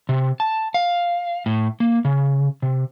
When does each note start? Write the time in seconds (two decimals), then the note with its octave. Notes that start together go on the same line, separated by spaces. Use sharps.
0.09 C3
0.40 A5
0.74 F5
1.46 A2
1.80 A#3
2.05 C#3
2.62 C3